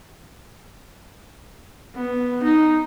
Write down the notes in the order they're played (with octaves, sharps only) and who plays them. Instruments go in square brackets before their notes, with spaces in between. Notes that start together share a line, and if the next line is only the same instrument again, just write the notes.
[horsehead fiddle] B3
D#4